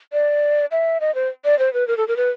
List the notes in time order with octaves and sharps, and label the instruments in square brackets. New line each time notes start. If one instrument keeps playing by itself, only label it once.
[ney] D5
E5
D#5
C5
D5
C5
B4
A#4
A4
A#4
B4